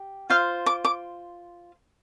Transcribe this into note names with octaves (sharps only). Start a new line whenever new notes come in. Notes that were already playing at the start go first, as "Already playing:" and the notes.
Already playing: G4
F4 C5 F5
D6
D6